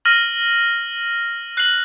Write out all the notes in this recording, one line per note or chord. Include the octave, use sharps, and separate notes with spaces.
F6 A#6 D#7 F#7
F#6 C7 F#7